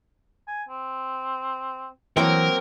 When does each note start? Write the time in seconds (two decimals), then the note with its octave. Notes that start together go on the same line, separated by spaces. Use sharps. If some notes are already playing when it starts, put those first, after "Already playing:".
0.47 G#5
0.69 C4
2.17 E3 F#3 A#3 C4 A#4